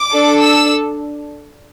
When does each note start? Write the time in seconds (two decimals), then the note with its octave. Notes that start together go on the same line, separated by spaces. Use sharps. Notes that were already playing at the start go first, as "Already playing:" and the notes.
Already playing: D6
0.12 D4 A4
0.43 E6